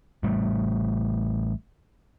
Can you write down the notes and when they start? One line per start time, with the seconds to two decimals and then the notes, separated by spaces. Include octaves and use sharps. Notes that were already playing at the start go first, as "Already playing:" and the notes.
0.23 A1 A2 G3 A3